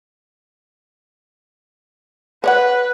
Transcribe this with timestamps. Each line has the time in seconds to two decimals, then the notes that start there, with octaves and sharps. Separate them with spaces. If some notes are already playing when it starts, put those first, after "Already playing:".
2.44 B4 C#5 D5 F#5